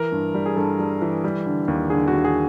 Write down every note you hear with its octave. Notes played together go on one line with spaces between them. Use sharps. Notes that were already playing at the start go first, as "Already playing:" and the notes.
Already playing: E3 A#4
G2
G3
G#4
G2 A4
G3
E3
G3
D3
D#2
D3 G#4
F#4
D#2
G#4